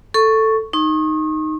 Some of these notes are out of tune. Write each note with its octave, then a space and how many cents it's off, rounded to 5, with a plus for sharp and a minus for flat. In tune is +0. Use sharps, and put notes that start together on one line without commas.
A4 +5 C#6 +0
D#4 -5 C#6 -40